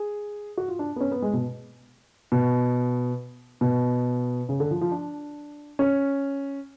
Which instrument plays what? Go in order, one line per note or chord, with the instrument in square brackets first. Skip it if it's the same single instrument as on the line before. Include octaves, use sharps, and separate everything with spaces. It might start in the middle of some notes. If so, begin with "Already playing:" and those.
Already playing: [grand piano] G#4
F#4
F4
D4
B3
C#4
B3
G#3
B2
B2
B2
C#3
D3
F3
F3
D4
C#4